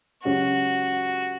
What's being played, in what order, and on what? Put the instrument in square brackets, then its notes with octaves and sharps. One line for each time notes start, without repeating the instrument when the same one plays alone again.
[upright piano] C#2 C#3 F#3 C#4 G4 [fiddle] F#4